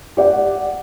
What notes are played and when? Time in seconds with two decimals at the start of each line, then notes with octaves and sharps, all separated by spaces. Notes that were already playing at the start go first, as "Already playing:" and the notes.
0.17 G4 D5 F#5